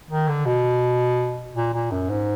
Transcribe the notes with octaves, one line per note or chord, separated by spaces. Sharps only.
D#3
D3
B2
A#2
A#2
F#2
G#2